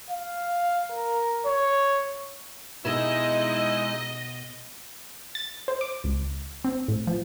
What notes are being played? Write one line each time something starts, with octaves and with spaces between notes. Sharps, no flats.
F5
A#4
C#5
B2 G#3 D#4 E4 G4 D#5
A6
C5
D6
C#2
C4
A2
F3